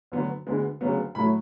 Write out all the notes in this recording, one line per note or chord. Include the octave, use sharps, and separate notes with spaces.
D2 D3 F#3 B3
D2 D3 G#3 B3
D2 C#3 F#3 B3
A2 F#3 A3 B5